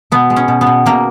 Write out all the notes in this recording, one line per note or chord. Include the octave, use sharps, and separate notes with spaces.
B2 B3
G#3
C#4
B2
B3
B2
B2 A#3